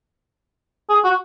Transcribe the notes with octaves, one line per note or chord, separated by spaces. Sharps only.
G#4
F#4